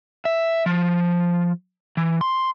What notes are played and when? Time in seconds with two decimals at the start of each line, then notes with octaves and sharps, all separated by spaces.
0.25 E5
0.66 F3
1.97 E3
2.21 C6